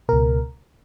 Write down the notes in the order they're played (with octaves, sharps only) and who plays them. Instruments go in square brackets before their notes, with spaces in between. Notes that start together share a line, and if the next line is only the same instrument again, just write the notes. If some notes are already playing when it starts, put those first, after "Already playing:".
[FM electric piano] C#2 B2 A#4